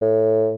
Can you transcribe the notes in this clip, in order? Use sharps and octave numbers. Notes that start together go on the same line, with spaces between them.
A2